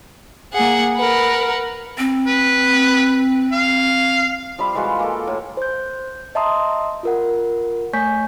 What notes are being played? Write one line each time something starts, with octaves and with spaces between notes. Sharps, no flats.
A#3 G#4 F#5
A#4 B4 F#5
C4
B4
F5
F3 G3 E5 B5
E3 G#3 F4 F#4
A#3 A4
A2
C5 G6
D#5 E5 A5 A#5 C6 D#6
F4 A#4 F#5
A3 C#5 G#5 C#6 G6 B6